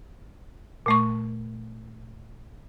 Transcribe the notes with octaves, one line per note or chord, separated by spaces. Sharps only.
A#2 A3 C#6